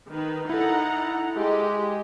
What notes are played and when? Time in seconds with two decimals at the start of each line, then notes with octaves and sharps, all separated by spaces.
0.10 D#3 B4
0.49 D#4 E4 A4 F#5 A#5
1.37 G#3 G4